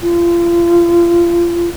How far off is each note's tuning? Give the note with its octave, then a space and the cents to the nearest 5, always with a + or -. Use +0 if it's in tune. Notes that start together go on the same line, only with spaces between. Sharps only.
F4 -30